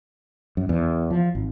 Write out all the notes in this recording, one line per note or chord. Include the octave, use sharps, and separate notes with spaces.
F#2
E2
F3
G#1